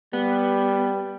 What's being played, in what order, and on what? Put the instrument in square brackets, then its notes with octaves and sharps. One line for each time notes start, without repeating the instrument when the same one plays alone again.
[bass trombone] G3 [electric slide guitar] B3